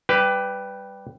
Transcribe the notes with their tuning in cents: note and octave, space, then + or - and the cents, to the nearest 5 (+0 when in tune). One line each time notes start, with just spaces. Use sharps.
G3 +0 G4 +0 B4 +15